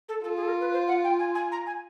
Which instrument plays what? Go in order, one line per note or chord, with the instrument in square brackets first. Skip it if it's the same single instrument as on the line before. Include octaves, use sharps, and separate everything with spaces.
[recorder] A4
[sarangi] F4 [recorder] A4
[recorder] G#4
A4
A#4
B4
C5
F#5
G5
G#5
G#5
A#5
G#5